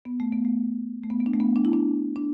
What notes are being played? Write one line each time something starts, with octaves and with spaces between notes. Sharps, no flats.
B3
A3
B3
A3
A3
B3
B3
D4
A3
B3
D4
E4
D4
D4